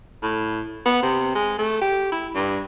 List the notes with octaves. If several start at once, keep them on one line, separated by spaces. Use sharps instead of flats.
A2
B3
C3
G#3
A3
G4
E4
G2